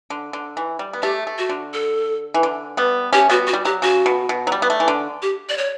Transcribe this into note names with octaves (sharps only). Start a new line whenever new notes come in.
D3
D3
E3
G3
B3
A3 G4
A3
F#4
D3
A4
E3
D3
G3 B3
A3 C#4 G4
G3 B3 F#4
F#4
G3
F#3 G4
C#3 F#4
B2
B2
F#3
G3
B3
A3
E3
D3
G4
D5
C#5